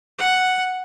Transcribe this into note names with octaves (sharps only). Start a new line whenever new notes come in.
F#5